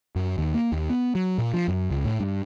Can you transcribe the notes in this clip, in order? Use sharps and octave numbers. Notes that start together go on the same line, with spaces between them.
F#2
D#2
A#3
D#2
B3
F#3
A#2
F3
F#2
C#2
A2
G2